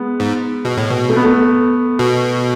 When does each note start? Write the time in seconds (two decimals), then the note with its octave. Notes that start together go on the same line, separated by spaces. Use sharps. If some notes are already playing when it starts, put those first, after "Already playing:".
Already playing: G#3 B3
0.20 G#2
0.65 B2
0.77 A2
0.90 B2
1.09 A3
1.16 B3
1.25 A3
1.99 B2